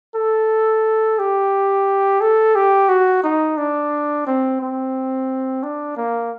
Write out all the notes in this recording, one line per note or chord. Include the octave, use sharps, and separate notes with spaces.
A4
G4
A4
G4
F#4
D#4
D4
C4
C4
D4
A#3